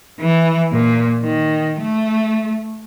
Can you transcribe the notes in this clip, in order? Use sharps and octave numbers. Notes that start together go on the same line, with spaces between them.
E3
A#2
D#3
A3